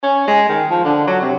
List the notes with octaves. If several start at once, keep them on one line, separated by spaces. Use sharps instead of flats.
C#4
G#3
D#3
F3
D3
F#3
C3